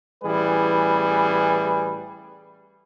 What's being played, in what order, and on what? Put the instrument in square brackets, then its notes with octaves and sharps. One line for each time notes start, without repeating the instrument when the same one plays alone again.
[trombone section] A1 E3 G3 G#4 B4